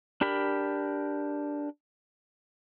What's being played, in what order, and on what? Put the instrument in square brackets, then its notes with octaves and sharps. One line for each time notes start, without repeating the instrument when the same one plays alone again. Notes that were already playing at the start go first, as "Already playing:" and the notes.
[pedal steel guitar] D4 G4 A#4 B5